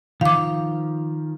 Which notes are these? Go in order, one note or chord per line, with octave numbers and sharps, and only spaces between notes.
D#3 F3 F5 D6